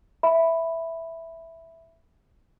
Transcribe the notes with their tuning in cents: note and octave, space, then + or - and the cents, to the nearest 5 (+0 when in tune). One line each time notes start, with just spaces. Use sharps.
E5 +0 B5 +0